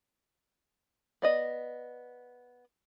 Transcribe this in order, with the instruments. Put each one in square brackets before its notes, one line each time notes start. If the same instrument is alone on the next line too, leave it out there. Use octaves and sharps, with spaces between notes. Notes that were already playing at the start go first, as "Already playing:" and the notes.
[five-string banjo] B3 D5 D#5